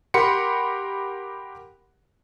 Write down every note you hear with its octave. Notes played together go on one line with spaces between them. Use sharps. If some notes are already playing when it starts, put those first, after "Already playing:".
G4 A#4 F#5 B5 C6 C#7